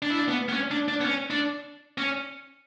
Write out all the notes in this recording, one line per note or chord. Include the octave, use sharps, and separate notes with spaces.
D4
E4
D4
B3
B3
C#4
D4
D4
B3
C#4
D4
C#4